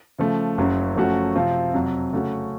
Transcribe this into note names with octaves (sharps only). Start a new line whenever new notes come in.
C#3 F3 A3
F#1 F#2 C#3 F#3
F#2 F3 A3 C#4 F#4
C3 F3 C4 F4
F2 C3 F#3
C#3 A3 C#4 F#4